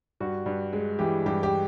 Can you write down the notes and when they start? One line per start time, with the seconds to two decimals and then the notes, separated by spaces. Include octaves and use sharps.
0.20 G2 F#4
0.46 G2
0.73 G#3
0.99 E3 G4
1.26 G2 G4
1.43 G4